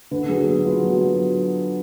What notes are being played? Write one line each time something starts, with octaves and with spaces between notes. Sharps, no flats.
D3 B4
F#3 G#4
B3
B3 F4
F#3